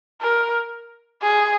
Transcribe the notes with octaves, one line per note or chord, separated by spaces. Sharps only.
A#4
G#4